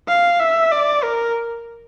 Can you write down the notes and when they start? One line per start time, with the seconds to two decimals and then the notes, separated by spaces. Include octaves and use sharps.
0.08 F5
0.40 E5
0.71 D5
1.03 A#4